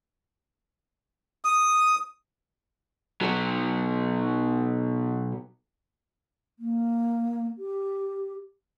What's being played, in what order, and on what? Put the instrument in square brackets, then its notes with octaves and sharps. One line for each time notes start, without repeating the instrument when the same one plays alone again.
[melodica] D#6
[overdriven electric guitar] B2 F#3
[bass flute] A#3
G4